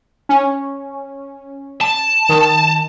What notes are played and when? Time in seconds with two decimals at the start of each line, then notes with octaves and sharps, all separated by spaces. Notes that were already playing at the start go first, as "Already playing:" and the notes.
0.29 C#4
1.81 A5
2.29 D#3